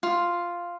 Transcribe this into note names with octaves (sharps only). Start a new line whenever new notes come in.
F4